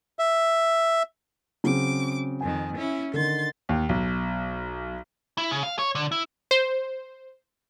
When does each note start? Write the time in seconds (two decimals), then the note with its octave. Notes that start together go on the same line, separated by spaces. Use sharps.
0.19 E5
1.64 C#3 F#3 C4 D6
2.41 F2 D#3 G#5
2.76 C#4 E4
3.14 D3 D#3 C6 A6
3.69 D#2
3.89 B1
5.38 E4
5.51 C#3
5.63 F5
5.79 C#5
5.95 D3
6.12 E4
6.51 C5